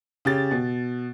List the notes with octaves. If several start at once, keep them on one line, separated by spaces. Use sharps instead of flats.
C#3 G4 A6
B2